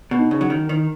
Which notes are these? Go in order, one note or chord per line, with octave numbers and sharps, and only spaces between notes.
B2
D#4
C#3
F#3
D#3
D#3